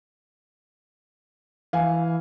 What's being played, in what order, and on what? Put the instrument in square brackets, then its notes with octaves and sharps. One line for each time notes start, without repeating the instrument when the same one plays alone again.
[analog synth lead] E3 [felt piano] F5 G#5